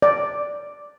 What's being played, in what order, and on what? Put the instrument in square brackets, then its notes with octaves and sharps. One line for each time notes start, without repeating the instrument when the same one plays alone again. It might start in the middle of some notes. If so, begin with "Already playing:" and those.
[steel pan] D5